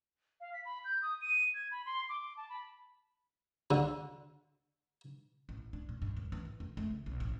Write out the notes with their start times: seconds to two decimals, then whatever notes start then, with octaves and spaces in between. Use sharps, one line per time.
0.41 F5
0.53 B6
0.65 B5
0.85 G6
1.02 D#6
1.21 D#7
1.54 G#6
1.71 B5
1.86 C6
2.09 D6
2.37 A5
2.49 B5
3.71 D2 D3
5.49 A1
5.73 D4
5.89 A#2
6.02 G2
6.17 D#2
6.32 E3
6.45 A2
6.60 F2
6.77 A3
6.91 C#3
7.06 B1
7.20 A1